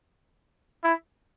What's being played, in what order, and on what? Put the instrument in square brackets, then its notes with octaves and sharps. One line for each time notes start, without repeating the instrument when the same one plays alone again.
[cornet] E4